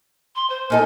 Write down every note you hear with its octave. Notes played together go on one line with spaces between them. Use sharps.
C6
C5
A#2 D#4 A4 G#5